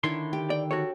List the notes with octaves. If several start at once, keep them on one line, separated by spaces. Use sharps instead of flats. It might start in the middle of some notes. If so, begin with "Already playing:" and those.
D3 D#3 D4 E4 C#5 C6
G4
D5 G5
F#4 A4 C#5